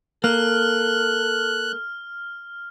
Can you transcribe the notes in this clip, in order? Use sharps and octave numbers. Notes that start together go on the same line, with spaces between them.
A#3 A4 F6 F#6